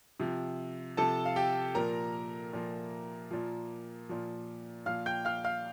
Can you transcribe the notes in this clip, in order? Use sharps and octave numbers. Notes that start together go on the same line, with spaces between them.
C3 F3
C3 F3 A4 A5
F5
G4 G5
A#2 F3 A#4 A#5
A#2 F3
A#2 F3
A#2 F3
A#2 F3 F5 F6
G5 G6
F5 F6
F5 F6